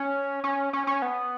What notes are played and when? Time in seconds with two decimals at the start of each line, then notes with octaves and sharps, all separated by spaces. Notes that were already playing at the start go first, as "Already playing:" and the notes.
Already playing: C#4
0.44 C#4
0.73 C#4
0.87 C#4
1.02 B3